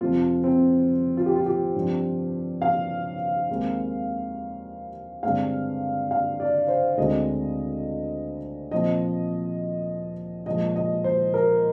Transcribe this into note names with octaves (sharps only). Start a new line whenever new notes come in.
F2 C3 F3 C4 F4
C4
F4
G4
F4
G4
G2 F3 C4
F5
D#2 D#3 G#3 C4
G2 D3 G#3 C4 F5
F5
D5
C5
D2 D3 G#3 C4 D#5
A#2 F3 C4 D#5
A#2 F3 G#3 D#5
D#5
C5
A#4